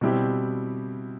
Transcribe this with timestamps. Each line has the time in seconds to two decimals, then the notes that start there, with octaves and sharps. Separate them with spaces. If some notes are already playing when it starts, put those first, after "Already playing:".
0.01 B2 G3 C4 E4 G4